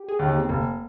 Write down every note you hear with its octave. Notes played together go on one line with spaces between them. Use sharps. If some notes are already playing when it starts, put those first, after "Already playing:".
Already playing: G4
G#4
D#2 D#3
G4
C4
F1 A#3